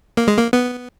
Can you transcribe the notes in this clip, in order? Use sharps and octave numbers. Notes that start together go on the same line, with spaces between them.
A#3
G#3
A#3
B3